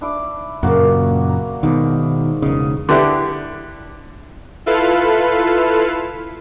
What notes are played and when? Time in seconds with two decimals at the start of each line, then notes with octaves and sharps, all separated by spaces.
0.01 D4 E4 D6
0.63 F#2 A#2 C#3 A#3 F#4 A5
1.29 A#5
1.63 G#2 B2 D#3 D6
2.42 E1 C#3 D#5
2.89 D3 D4 E4 G4 B4
4.66 E4 F4 A4 B4 F5